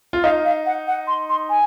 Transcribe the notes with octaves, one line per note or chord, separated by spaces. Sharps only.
F4
D#4 F5
F5
F#5
F#5
C6
C6
G#5